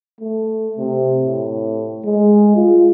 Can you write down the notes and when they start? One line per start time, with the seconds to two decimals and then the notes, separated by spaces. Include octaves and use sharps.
0.21 A3
0.78 C3
1.25 A2
2.05 G#3
2.56 F4